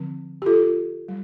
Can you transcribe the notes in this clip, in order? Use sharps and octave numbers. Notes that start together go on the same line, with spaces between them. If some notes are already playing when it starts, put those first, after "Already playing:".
Already playing: D3 F3 C4
G4
F4 A4
G3